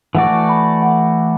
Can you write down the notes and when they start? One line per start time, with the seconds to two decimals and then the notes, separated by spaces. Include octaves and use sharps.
0.15 E3 A3 F#4 D5 F#5
0.49 B5
0.82 F#5